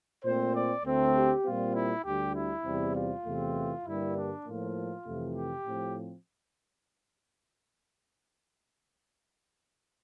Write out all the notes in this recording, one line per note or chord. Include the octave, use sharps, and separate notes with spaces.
A#2 A3 C4 C5
D5
D2 D3 A3 C4
G4
A#2 G3 C4 F4
E4
D2 D3 G3 G4
E4
E2 C3 G3 C4
F4
E2 C3 E3 A3 C4
G2 D3 G3 A#3 E4
D4
A2 F3 A#3 F4
F2 C3 E3 A3
G4
A2 F3 C4